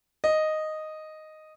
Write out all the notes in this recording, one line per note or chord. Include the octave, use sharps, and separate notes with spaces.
D#5